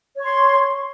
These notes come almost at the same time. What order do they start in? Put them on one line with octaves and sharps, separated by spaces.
C#5 C#6 C6